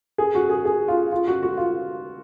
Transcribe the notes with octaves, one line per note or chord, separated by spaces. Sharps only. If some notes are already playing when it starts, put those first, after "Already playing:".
G#4
F#4
G#4
G#4
F4
F4
F#4
F#4
F4